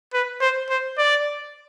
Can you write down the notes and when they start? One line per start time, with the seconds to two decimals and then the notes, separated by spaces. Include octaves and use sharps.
0.13 B4
0.41 C5
0.69 C5
0.98 D5